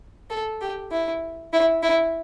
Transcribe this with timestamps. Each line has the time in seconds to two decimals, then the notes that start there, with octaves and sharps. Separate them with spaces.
0.30 A4
0.61 G4
0.91 E4
1.53 E4
1.83 E4